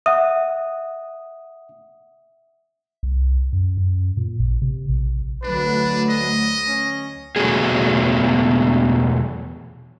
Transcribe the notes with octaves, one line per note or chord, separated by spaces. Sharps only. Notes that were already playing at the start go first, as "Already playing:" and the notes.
E5 F#5 D#6
C2
F#2
F#2
A#2
A1
C3
A#1
D2 F#3 A3 D4 B4
D#5
C#4
E2 B2 F#3 A3 B3 G#4